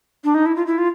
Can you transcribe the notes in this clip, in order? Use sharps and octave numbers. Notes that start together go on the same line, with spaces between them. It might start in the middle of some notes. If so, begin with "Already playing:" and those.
D4
D#4
E4
F4
E4
F4